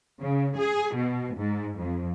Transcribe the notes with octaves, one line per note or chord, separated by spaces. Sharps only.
C#3
G#4
B2
G#2
F2